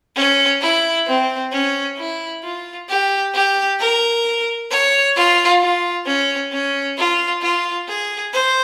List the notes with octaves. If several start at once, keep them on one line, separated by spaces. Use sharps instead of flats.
C#4
E4
C4
C#4
E4
F4
G4
G4
A#4
C#5
F4
F4
C#4
C#4
F4
F4
G#4
C5